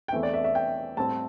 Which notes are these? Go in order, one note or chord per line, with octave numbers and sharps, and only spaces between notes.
G5
E2 E3 A3 C4 E5
D5
E5
E5
G5
A2 G3 C4 A5